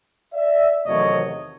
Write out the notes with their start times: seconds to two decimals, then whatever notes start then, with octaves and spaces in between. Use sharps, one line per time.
0.34 D5 E5
0.86 E2 C3 D#3 F#3 A3 C#5 D#5